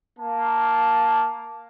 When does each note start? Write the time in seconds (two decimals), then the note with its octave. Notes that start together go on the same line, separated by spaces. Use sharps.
0.18 A#3 A5